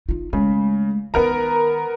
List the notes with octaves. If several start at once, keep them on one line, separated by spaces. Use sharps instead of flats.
D#4 F4
C#3 G#3 A3
D#3 B3 D#4 A#4 A#5